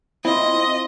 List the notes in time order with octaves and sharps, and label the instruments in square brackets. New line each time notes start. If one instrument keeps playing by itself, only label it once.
[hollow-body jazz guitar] C4 F4 [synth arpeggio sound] E4 [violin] D#5